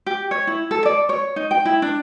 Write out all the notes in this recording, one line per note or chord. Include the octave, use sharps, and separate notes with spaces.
G4
C#5
E4
A4
D5
C#5
D#4
G5
E4
D4